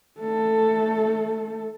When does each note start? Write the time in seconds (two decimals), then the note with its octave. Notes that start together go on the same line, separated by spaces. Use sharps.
0.20 A3 A4